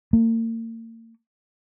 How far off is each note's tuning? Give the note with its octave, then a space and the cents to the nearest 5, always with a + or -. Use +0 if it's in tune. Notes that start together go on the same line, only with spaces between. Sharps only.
A#3 -40